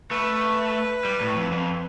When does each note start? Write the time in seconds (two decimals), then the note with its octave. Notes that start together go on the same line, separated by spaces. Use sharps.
0.10 A3 B4
1.05 G3
1.21 A2
1.36 F2
1.51 F2